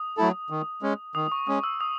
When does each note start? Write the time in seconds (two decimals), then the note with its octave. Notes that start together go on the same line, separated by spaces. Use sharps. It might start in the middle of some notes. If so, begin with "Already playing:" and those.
Already playing: D#6
0.17 F#3 A3 E4 A4
0.50 D#3
0.82 G#3 C#4
1.15 D#3 D#6
1.32 C#6
1.47 G#3 C#4 D#6
1.64 E6
1.80 D#6